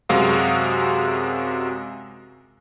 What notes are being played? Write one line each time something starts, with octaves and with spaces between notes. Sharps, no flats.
F#2 C3 G#3 F#4 F5 D#6